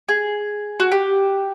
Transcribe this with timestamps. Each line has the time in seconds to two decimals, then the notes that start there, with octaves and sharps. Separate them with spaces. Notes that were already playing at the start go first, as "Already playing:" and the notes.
0.09 G#4
0.80 F#4
0.92 G4